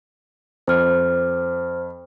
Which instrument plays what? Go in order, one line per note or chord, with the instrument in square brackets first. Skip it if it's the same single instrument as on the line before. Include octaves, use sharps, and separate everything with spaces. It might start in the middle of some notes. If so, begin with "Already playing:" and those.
[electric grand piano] F2 [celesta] C5 F6